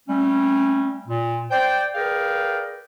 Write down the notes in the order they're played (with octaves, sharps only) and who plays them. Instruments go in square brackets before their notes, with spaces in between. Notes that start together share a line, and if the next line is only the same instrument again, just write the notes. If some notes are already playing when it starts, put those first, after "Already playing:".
[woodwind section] G3 A3 C4 C#4
A#2
C5 D5 G5
G#4 A#4 B4 D5 F5 G5